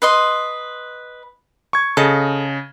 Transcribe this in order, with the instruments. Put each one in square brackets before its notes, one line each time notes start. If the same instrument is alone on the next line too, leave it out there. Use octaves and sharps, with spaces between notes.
[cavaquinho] B4 D#5 C6
[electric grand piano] C#6 G#6
[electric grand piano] C#3 D#5 [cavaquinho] A4